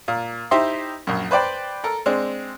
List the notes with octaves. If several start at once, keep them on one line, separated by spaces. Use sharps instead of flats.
A#2
D#4 E4 G4 C5 E5 C6
A#1 F#2
B4 C5 D5 G5 B5
A4 A#4
G#3 C4 D4